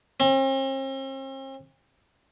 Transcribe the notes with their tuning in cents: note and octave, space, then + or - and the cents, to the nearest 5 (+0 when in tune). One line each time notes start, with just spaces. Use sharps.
C4 +45